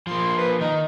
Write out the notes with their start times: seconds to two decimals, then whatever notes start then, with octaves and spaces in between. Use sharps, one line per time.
0.07 F3 A#3 C6
0.38 B4
0.61 D#3 D#4